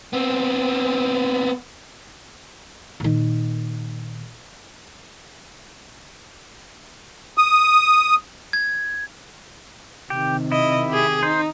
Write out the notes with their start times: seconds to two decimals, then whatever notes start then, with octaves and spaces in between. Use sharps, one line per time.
0.13 B3 C4
3.00 A#2 D#3
7.38 D#6
8.53 G#6
10.10 C3 D#3 G4
10.52 E4 D#5
10.89 G4 G#4
11.23 D#4 C5